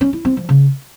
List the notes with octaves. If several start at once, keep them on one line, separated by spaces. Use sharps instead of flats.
C#4
E4
C4
F3
C#3